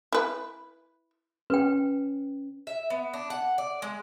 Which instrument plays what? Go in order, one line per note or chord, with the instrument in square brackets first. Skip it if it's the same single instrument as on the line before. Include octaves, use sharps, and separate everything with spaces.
[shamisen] E4 B4
[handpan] C#4 [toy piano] B4 G5
[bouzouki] E5
B3
D4
F#5
D5
G#3